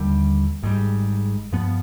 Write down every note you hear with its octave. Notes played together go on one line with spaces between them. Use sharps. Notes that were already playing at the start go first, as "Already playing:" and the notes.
Already playing: D#2 D3 G3
G#1 G#2 D#3 G3
G2 F3 B3